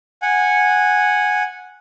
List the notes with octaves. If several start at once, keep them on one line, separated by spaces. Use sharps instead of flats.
F#5 G#5